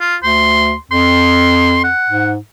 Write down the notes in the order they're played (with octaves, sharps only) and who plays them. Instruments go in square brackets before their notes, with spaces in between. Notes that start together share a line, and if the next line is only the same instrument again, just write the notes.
[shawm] F4
[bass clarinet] D2 [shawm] C6
[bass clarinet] F2 [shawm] C6
[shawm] F#5
[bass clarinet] G#2